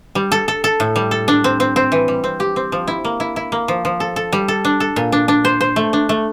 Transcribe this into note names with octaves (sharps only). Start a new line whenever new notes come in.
G3
A4
A4
A4
A2
G3
A4
D4
C4
C4
C4
E3
G3
C4
G4
C4
F3
E4
A#3
E4
E4
A#3
F3
F3
A4
A4
G3
A4
D4
A4
A#2
D4
D4
C5
C5
A3
D4
A3